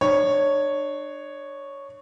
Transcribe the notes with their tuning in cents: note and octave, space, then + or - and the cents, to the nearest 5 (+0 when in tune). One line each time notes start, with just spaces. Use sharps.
D4 +35 C#5 +0